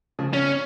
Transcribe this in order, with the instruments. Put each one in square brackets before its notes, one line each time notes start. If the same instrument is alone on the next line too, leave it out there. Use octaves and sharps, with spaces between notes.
[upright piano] C#3 F3
[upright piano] C#3 [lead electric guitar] C#4